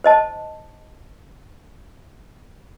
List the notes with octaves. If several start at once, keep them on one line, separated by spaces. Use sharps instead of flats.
C5 D#5 A5